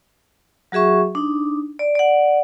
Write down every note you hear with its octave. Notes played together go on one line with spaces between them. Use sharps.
F#3 F#4 G#4 E5 C#6
D4 D#4
D5
D5 F#5